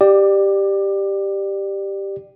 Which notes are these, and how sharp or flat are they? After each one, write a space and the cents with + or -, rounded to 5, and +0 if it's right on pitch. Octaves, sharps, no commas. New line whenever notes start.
G4 +0 D5 +20